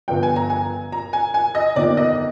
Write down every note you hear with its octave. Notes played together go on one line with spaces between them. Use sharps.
G1 G2 F3 G5
G#5
A#5
G#5
A#5
G#5
G#5
D#5
G1 F2 D#3 A#3 D5
D#5